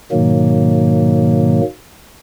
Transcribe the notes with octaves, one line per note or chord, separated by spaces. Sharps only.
G#2 B2 D#3 F#3 A#3